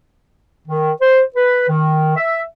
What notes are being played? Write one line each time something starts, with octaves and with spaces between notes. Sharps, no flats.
D#3
C5
B4
D#3
E5